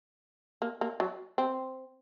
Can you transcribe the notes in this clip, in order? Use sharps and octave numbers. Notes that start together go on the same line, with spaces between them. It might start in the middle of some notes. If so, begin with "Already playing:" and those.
A#3
A#3
F#3
C4